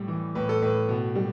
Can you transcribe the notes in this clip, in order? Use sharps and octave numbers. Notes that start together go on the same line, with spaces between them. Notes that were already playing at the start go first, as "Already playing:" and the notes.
Already playing: A2 G3
E3
A2 B4
A4
A2 B4
B2
G3